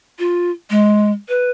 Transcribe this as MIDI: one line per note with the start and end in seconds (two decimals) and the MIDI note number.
0.19 0.51 65
0.70 1.11 56
1.29 1.51 71